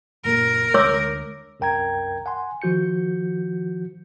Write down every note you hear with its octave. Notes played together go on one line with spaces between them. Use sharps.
F#1 A#2 A#4
D2 G#3 C#5 D6 E6
C2 F#2 A#4 G5 A#5 G#6
F#5 G#5 C6
D#3 F3 F#4 G6 C#7